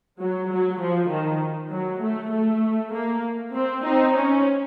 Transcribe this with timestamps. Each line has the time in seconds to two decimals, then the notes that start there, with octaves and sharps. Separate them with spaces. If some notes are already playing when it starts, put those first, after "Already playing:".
0.21 F#3
0.51 F#3
0.81 F3
1.12 D#3
1.73 F#3
2.03 A3
2.33 A3
2.94 A#3
3.55 C4
3.85 C4 D#4
4.15 C#4